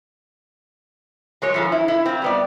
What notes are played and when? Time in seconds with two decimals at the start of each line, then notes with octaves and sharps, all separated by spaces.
1.42 F#3 G#3 C#5
1.54 E3 F3 A4
1.72 E4
1.88 E4
2.06 C4 F4
2.22 G3 B3 D5